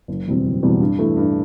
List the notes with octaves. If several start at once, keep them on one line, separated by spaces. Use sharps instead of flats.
F#1
E2 B2 G3 C4
F#1
E2 B2 G3 C4
G2
E3 A3 E4
G2